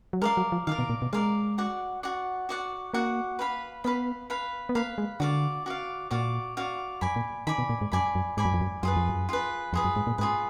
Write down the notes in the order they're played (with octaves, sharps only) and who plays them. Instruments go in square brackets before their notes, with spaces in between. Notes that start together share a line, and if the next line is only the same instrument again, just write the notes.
[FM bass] F#3
[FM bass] G#3 [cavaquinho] A#4 D5 F5
[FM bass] F#3
F3
[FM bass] D#3 [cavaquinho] A#4 D5 F5
[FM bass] B2
A#2
B2
[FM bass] G#3 [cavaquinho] A#4 D5 F5
[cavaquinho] F#4 D5 F#5
F#4 D5 F#5
F#4 D5 F#5
[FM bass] A#3 [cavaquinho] F#4 D5 F#5
[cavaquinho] B4 F5 B5
[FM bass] B3 [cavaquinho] B4 F5 B5
[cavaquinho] B4 F5 B5
[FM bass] B3
[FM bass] A#3 [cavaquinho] B4 F5 B5
[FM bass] G#3
[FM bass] D3 [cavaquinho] F#4 D5 F5
[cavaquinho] F#4 D5 F5
[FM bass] A#2 [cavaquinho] F#4 D5 F5
[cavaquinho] F#4 D5 F5
[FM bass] F#2 [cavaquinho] D5 G#5 B5
[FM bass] A#2
[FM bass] D#3 [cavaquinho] D5 G#5 B5
[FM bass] B2
A#2
G#2
[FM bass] F#2 [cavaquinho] D5 G#5 B5
[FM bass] F#2
[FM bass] G#2 [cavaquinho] D5 G#5 B5
[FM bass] F#2
F2
F#2
[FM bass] F#2 [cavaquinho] F4 G#4 B4
[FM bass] F2
F#2
[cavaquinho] F4 G#4 B4
[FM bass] F2 [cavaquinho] F4 G#4 B4
[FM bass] F#2
G#2
A#2
[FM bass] G#2 [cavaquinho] F4 G#4 B4